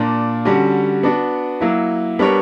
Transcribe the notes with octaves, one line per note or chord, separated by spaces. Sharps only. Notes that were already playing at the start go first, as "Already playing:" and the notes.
Already playing: A#2 A#3 D4
D3 G3 C#4 F#4
B3 D4 F#4
F#3 A#3 E4
G3 B3 D4 A#4 C#5